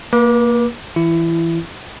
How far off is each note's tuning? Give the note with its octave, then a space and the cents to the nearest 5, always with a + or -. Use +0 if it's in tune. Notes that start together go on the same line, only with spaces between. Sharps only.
A#3 +0 B4 -45 D6 +0
E3 +0 E4 +20